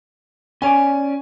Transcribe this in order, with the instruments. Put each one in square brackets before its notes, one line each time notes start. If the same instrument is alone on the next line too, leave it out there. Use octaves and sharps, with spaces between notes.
[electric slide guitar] C#4 C#5 D5 [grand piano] G#5